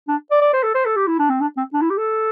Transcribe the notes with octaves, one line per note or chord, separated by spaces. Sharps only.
D4
D5
D5
C5
A4
C5
A4
G4
E4
D4
C4
D4
C4
D4
E4
G4
A4